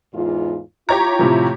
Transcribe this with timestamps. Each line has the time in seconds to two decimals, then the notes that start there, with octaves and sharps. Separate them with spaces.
0.13 E2 G#2 F4
0.89 E4 F4 G4 C#5 A#5
1.19 A2 C3 F3